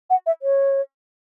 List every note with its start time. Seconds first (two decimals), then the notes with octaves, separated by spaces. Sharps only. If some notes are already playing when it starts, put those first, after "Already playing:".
0.10 F#5
0.26 E5
0.42 C#5